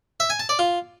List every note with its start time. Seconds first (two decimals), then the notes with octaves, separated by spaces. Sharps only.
0.20 E5
0.30 G#5
0.40 A5
0.49 D5
0.59 F4